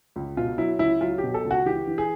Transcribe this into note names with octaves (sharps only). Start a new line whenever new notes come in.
C#2
B2 F4
F#3 E4
C#2 E4
F#3 F4
G4
B2
A4
C#2
F#4
E3 G4
E3
G#4